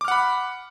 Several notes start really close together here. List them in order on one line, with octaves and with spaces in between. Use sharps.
D6 F6 F#5 B5